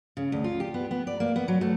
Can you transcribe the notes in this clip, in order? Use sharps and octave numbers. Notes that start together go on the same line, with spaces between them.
C#3
D2
F4
G4
B3
B3
D5
A#3
B3
F#3
A3